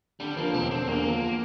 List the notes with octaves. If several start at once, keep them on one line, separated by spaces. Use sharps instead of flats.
D3 G3
F3 A#3
E1 C4
D3 C4
E2 A#3
F3